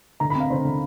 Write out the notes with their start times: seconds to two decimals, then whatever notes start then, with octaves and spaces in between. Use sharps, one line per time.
0.20 D3 A#5
0.30 C4 B5
0.40 F5
0.50 D3 C5
0.65 D3